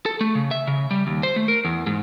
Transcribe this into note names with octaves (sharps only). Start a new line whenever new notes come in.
A4
A3
C#3
E5
C#3
G3
D#2
C5
A3
A#4
E2
G#2